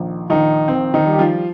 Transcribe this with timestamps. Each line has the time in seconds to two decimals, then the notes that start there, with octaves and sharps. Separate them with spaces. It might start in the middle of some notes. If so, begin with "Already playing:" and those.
Already playing: A#1 D#3
0.30 A#1 D#3 D#4
0.68 D#3 C4
0.94 D#3 D#4
1.06 G3
1.13 G4
1.19 F3 F4